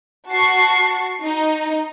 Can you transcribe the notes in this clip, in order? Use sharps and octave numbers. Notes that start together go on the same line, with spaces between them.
F#4 A5 C#6 C7
D#4